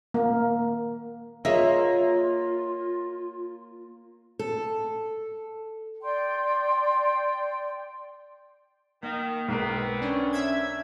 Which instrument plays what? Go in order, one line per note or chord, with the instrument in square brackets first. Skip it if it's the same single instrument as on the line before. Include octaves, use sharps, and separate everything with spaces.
[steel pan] A#3
[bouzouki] A#3 [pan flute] F4 [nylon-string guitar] G#4 C#5 D#5 [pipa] E5
[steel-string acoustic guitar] A4
[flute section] D5 G5 C6
[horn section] D#3 [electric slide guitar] A#3
[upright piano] B1 A#4 [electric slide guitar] G#3 [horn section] B3 C4
[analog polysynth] C#4 [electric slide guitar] D4
[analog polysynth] E5 G#6